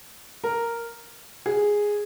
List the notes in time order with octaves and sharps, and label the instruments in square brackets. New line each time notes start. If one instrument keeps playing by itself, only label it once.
[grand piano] A#4
G#4